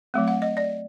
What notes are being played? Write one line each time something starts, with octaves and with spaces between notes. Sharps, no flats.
F#3 A3 C4
F#5
D#5
D5